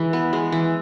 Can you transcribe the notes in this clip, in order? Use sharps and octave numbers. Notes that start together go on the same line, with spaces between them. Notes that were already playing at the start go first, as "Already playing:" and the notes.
Already playing: E3 G#3 B5
B3
G#3
E3